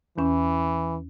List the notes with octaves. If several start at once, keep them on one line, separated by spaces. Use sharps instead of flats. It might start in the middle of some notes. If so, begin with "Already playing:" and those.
E2 E3 C#4